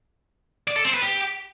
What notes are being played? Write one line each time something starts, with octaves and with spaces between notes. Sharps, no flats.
D5
A4
C4
B4
G4